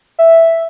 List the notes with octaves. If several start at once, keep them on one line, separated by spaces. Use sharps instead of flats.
E5